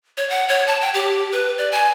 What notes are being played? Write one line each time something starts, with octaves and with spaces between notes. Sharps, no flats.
C#5
F#5
C#5
A5
G5
G4
B4
D5
G#5